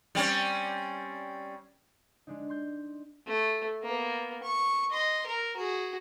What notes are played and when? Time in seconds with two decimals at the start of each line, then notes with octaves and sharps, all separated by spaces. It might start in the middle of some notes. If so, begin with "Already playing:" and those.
0.15 G3 C4 C#4
2.27 G#3 D4 D#4
2.49 C6 G6
3.27 A3
3.82 A#3 B3
4.43 C#6
4.91 D#5 C6
5.26 A#4
5.56 F#4 G#4